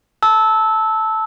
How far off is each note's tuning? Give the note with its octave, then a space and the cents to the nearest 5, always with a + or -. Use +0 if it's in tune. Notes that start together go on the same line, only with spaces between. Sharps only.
A5 +0 E6 -15